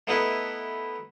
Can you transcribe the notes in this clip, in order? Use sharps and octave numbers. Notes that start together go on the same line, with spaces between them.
A3 B3 D#4 E4 B4